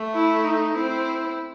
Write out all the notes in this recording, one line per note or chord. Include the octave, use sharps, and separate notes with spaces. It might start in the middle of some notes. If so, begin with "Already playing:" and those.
Already playing: A3
E4
D#4
C4 E4